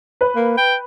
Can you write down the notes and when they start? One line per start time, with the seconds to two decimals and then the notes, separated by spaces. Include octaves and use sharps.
0.21 B4
0.35 A#3
0.58 G5